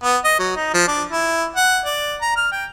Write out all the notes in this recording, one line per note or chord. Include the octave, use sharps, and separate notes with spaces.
B3
D#5
F#3
D#4
F3
D4
E4
F#5
D5
A#5
F6
G5